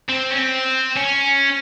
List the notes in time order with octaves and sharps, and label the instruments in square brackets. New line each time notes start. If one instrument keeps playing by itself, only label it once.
[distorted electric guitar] C4
C#4
C4
C#4